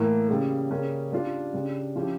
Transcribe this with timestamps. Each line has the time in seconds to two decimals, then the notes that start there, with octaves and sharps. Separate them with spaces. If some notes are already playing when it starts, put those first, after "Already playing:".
Already playing: A2 E3 A#3
0.29 C#3 G3 A#3
0.70 C#3 G3 A#3 C#4
1.12 G3 D4 F4
1.54 C#3 G3 D4
1.96 F3 C#4 E4 G4